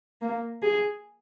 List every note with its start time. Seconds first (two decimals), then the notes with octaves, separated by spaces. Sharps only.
0.21 A#3
0.62 G#4